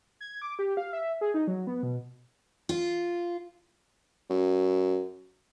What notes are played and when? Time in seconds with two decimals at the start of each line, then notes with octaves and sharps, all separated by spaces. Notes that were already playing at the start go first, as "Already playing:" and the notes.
0.20 G#6
0.42 D6
0.59 G4
0.77 F5
0.93 E5
1.21 G#4
1.34 D#4
1.47 F#3
1.67 B3
1.83 B2
2.69 F4
4.30 F#2